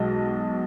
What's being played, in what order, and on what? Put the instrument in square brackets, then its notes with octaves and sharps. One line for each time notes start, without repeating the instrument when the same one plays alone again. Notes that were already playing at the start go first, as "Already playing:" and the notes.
Already playing: [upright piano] B1 B2 G#3 D#5